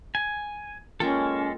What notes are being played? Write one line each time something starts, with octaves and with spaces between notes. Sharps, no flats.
G#5
G#3 A#3 C#4 F4 A4 G5